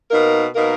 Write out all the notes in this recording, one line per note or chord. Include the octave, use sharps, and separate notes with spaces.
B2 A#3 D#4 A#4
B2 A#3 D#4 A#4